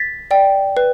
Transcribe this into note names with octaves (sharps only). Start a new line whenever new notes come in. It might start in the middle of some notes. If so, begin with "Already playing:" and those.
Already playing: A6 B6
D5 G5
B4